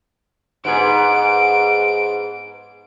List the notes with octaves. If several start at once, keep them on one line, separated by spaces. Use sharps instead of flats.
G#2 B3 G#4 D7